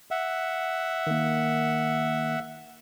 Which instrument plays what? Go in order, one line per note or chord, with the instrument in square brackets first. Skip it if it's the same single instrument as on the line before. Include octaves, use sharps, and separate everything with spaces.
[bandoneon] E5 F#5
[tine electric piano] D#3 A#3